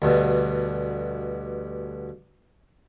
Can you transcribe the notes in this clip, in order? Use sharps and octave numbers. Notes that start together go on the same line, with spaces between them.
D2 G2 B2